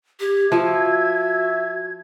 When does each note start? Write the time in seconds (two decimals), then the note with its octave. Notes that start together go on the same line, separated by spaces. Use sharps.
0.20 G4 G#6
0.52 F3 F#4 E5